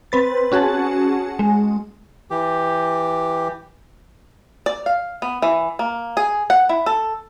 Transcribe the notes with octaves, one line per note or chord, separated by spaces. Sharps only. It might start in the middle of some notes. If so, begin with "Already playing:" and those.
C4 B4 A6
C#4 F#4 G#4 F#5 A5
G#3
E3 G4
D5
F5
B3
E3
A#3
G#4
F#5
E4
A4